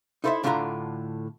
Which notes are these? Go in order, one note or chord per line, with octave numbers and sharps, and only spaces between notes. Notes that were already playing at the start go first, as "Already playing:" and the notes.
D#4 E4 A4 C5 C#5 E5
A2 D3 D4 F4 F5 A#5